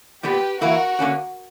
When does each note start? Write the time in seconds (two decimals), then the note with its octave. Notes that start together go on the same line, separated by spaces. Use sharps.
0.23 A#2 G3 B3 G4 B4
0.61 E3 A#3 E4 F#4 A#4
0.99 D3 A#3 C#4 F#4